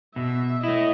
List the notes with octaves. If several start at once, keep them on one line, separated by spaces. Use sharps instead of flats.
B2 E5
A3 E4 D#5